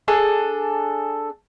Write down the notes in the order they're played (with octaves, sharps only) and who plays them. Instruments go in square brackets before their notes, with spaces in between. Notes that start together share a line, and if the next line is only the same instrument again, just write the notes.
[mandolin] D4 G#4 A4